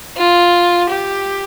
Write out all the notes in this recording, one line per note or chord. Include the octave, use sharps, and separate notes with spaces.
F4
G4